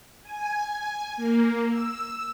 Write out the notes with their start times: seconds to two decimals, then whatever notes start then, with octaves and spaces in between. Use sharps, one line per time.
0.23 G#5
1.17 A#3
1.70 E6